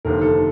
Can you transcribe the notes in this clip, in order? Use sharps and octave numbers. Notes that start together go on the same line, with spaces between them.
F1 D#2 D3 F3 A#4
A4